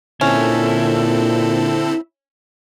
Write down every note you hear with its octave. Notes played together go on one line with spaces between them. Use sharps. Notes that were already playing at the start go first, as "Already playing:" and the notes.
A#2 D3 C4 C#4 E4 A4